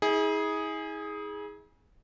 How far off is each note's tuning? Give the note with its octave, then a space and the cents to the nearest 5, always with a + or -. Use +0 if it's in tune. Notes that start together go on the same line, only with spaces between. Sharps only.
E4 -45 G#4 +0